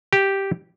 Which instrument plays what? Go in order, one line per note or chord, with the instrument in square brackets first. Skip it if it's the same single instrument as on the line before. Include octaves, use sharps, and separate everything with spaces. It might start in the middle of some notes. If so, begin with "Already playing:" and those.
[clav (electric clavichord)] G4